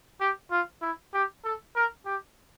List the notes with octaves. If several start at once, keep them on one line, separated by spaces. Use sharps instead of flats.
G4
F4
E4
G4
A4
A#4
G4